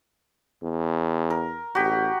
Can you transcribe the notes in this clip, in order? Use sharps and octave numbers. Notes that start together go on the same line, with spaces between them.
E2
A#4
A1 F#4 G4